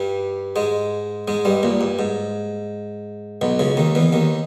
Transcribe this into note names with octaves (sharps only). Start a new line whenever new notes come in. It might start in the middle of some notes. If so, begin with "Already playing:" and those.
Already playing: G2 G3
G#2 G#3
G#2 G#3
G2 G3
A#1 A#2
G2
G#2
B1 B2
C#2 C#3
D#2 D#3
E2 E3
D#2 D#3